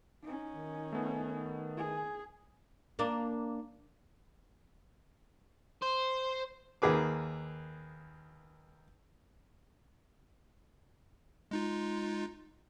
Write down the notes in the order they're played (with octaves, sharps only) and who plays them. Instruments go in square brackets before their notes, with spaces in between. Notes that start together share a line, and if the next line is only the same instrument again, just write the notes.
[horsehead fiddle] C#4 D#4
[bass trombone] D#3
[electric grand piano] A3 B3
[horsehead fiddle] G#4
[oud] A#3 D4
[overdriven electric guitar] C5
[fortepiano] D#2 A#3 G#4 B4 D6
[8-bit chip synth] G#3 D#4 F4